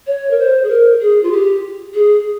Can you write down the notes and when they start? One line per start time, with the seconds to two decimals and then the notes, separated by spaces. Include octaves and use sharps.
0.07 C#5
0.30 A#4
0.38 C5
0.63 G#4
0.69 A#4
1.00 G#4
1.23 F4
1.31 G4
1.94 G#4